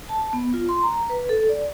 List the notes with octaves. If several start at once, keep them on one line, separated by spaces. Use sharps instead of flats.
A5
B3
F4
C6
A#5
B4
A4
D5